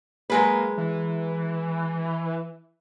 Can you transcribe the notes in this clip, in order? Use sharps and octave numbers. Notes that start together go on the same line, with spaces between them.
F#3 G#3 A#3 B4
E3